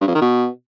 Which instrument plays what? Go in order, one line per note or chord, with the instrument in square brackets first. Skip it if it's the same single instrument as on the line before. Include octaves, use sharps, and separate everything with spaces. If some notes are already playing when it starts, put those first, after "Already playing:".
[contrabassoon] G2
F2
D#3
B2